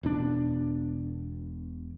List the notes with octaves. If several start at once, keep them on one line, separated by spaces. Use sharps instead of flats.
E1 B2 D4